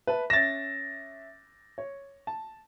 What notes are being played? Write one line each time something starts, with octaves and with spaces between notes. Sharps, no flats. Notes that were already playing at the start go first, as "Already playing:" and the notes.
B4 E5 A5
C#4 E5 A6 A#6 E7
C#5
A5